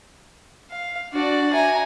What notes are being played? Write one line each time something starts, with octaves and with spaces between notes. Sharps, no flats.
F5
D4 F#4 D5
E5 G#5 A#5